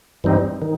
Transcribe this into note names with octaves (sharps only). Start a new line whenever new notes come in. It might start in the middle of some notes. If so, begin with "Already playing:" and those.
G2 E3 G3 C4 D#4
D#3